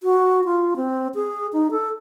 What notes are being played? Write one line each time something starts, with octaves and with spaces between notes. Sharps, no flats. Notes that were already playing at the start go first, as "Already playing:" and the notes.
F#4
F4
C4
G#4
D#4
A4